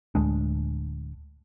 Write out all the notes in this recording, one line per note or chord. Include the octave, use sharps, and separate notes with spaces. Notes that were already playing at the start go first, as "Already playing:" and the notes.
D1 D2 G#3 D4